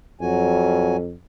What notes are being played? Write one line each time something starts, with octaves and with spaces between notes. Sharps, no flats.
F2 F#3 F#4 G#5